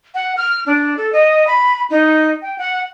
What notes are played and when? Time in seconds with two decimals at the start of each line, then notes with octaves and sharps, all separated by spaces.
0.15 F#5
0.37 F6
0.66 D4
0.97 A4
1.13 D#5
1.47 B5
1.90 D#4
2.42 G5
2.58 F#5